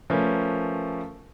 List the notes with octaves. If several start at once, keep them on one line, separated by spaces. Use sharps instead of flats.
F3 A3 C#4 A#4 B4